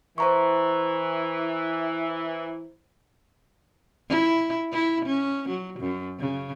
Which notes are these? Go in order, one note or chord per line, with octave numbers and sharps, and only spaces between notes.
E3 C5 A#5 C#6
E4
E4
C#4
F#3
F#2
C#3